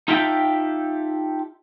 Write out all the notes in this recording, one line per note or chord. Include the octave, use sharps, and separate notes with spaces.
D#4 F4 G4 A4 E5 G5